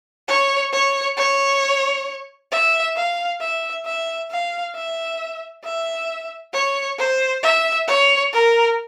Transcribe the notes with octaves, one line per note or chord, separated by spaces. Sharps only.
C#5
C#5
C#5
E5
F5
E5
E5
F5
E5
E5
C#5
C5
E5
C#5
A#4